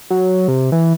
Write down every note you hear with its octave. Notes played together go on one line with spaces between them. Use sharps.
F#3
C3
E3